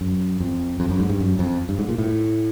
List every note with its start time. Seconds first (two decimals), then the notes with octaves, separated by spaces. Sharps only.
0.01 F#2
0.40 F2
0.80 F2
0.90 F#2
1.00 G#2
1.09 G2
1.20 F#2
1.39 F2
1.69 G2
1.79 G#2
1.89 A#2
1.98 A2